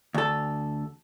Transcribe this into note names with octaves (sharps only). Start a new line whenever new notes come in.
D2 A4